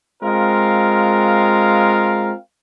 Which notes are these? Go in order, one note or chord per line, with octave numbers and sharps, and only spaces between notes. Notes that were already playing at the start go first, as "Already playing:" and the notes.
G#3 C4 F4 A#4 F5